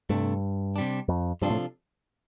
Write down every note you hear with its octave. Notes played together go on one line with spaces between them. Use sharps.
C2 G2 C3 A3 D4
C3 G3 D4
F2
G2 C3 F3 D4 F4 A4
A2